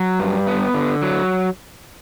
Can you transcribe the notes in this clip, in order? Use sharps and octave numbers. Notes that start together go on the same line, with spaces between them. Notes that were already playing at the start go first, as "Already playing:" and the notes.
Already playing: F#3
G2
B3
D3
F#3